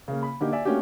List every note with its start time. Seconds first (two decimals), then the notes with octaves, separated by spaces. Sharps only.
0.08 C#3 A#3
0.23 B5
0.41 D3 A#3 D#4 G4
0.52 D5 E5 G#5
0.65 A3 A#3 C#4 D4 F#4 G4